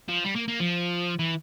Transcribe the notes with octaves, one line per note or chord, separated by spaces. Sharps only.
F3
G3
A#3
A#3
F3
E3